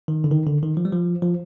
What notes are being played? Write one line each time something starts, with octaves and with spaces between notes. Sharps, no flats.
D#3
D3
D#3
D3
D#3
F3
G3
F3
F3